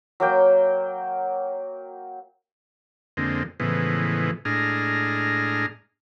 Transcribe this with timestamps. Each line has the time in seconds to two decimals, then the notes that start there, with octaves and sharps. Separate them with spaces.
0.20 F#3 A#3 G5
3.17 F2 D3 G#3 A#3 C4
3.60 A2 C#3 E3 F3 G#3 B3
4.45 A2 G#3 D4 G#4 A#5 F6